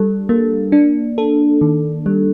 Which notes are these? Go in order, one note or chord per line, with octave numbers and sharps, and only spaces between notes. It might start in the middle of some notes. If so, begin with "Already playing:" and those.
Already playing: G3 D4 A4
A#3
D4
A4
D#3
G3